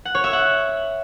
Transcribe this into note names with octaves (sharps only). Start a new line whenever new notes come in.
F#5
C#5
E5
F#5